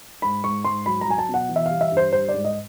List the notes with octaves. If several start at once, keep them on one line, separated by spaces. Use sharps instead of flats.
G#2 B5
G#2 C#6
G#2 C6
F#3 B5
A#5
F#3 G#5
A5
B2
F#5
E3
E5
G3 F5
E5
G2
C5
G3 C5
D5
G#2
D#5